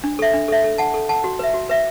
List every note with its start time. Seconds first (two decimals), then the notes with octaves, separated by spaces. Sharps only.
0.04 D4
0.19 A4 E5
0.34 D4
0.48 A4 E5
0.64 A4
0.78 F#5 A5
0.94 A4
1.09 F#5 A5
1.24 F#4
1.39 B4 E5
1.54 F#4
1.69 B4 E5